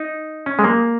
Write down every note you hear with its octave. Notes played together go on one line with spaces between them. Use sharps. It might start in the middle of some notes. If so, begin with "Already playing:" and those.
Already playing: D#4
C#4
G#3
A#3